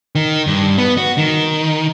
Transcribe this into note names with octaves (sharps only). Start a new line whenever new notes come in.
D#3
G2
B3
F#4
D#3